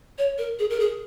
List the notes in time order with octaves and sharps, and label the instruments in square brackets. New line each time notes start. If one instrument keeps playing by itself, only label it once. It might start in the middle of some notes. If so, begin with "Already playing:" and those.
[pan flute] C#5
A#4
G#4
A#4
G#4